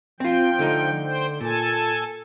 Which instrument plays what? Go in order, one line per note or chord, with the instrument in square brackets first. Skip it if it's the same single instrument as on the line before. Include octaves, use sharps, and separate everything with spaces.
[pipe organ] F3 G5 [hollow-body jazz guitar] C4 F4
[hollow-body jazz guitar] D3 A3 D#4
[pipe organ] C5 G5
[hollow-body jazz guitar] A#2 [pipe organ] A4 G#5 A5